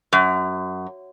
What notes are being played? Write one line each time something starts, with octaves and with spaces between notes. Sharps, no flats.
F#2